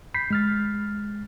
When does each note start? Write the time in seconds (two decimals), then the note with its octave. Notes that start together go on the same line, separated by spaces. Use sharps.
0.14 B5 G6 B6 C7
0.30 G#3 F6 A6